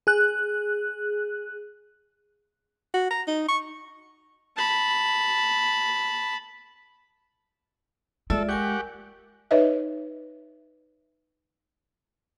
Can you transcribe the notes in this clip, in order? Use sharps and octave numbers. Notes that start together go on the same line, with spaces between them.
G#4 F#6
F#4
A#5
D#4
C#6
A5 B5
G#3 F4 A4 D5 E5
G4 A#4 F#5 G#5 C#6
D#4 B4 C#5 D#5 E5